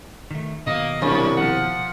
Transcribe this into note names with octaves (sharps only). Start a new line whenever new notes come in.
D#3 A3
B2 D#3 F#3 A#3 D#5
C2 F#2 C#5
F3 F#5